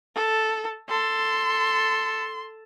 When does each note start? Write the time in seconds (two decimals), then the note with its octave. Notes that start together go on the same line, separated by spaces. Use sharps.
0.16 A4
0.89 A4 C6